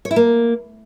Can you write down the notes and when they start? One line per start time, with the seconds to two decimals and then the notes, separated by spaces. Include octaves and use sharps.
0.05 C#5
0.11 E4
0.16 A#3